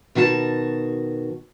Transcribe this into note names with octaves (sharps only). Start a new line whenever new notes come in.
B2 D#3 F#4 G#4 A5